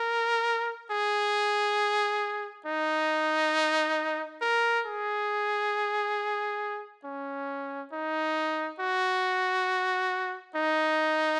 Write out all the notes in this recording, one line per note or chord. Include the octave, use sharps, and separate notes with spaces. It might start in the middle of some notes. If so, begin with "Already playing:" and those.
Already playing: A#4
G#4
D#4
A#4
G#4
C#4
D#4
F#4
D#4